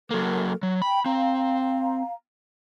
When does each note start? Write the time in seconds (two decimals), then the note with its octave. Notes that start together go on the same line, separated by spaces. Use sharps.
0.11 F#3 A#3 A4 A#4
0.63 F#3
0.82 G5 B5
1.06 C4 F5 A#5